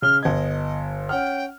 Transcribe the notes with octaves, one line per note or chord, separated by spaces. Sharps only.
C#3 F6 G7
G1 D#5 G#6
C#4 F#5 G5 F6